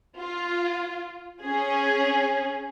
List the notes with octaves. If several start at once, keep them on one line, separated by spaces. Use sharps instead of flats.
F4
C#4 G#4